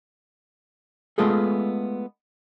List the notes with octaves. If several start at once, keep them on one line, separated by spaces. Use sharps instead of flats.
G#3 A3 B3 F4 G#4 A4